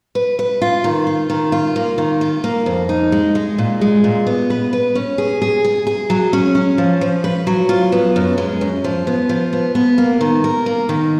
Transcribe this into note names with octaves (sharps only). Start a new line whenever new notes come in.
B4
B4
F4
D#3
F4
D#3
F4
A#3
D#3
F4
A#3
F2
D#4
G#3
G#3
A#2
G#3
A#2
B3
B4
B4
C#4
G#4
G#4
G#4
G#4
F#3
C#4
C#4
F3
F3
B4
F#3
F4
B3
F#2
G#3
F#2
F3
B3
F3
B3
B3
A#3
D#3
A#4
A#3
D#3